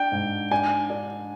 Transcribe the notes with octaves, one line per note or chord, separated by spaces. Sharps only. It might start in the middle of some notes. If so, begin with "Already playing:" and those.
Already playing: D4 G5
G#2
D4 G#5
D4